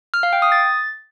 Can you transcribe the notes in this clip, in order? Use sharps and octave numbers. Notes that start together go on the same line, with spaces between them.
F6
F5
G5
D#6
A6